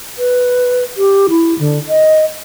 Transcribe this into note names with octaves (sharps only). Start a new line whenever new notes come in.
B4
G4
E4
D3
D#5